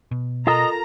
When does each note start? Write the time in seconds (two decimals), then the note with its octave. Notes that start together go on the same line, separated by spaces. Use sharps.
0.11 B2
0.47 F4 A4 A#4 D#5 A#5